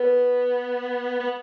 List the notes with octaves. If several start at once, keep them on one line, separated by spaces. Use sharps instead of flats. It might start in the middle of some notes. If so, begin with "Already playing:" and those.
Already playing: B3 B4
B3